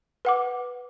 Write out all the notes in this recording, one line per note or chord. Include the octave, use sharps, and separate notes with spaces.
B4 F#5 D6